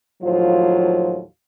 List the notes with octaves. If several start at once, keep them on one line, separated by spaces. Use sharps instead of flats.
D#2 A2 F3 F#3 F4 C5